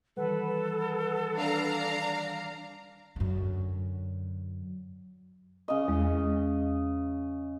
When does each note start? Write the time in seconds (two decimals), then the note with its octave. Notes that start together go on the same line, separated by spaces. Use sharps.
0.17 D#3 E3 G3 A4 B4 F#5
1.37 D4 F5 A#5
3.16 F#2 D3
5.68 C#3 D#5
5.88 E2 G#3